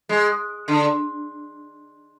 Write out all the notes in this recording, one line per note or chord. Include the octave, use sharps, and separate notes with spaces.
G#3
D3